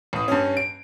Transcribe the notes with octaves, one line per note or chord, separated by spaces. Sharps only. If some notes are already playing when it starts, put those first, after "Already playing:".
A1 D#6
G2 C#4
D7